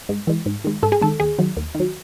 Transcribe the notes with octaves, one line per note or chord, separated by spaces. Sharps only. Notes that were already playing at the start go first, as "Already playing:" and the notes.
G#2
E3 G#3
G#2
D#3 G#3
G#2 A4
G#4
D#3 G#3 A4
D#2 G#4
D#3 F#3
D#2
D#3
F#3